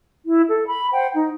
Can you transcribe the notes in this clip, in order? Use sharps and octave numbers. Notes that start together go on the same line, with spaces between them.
E4
A4
B5
C5 F#5 G5
D#4